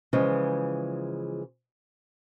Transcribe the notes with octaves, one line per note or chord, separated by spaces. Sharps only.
C#3 E3 F3 G#3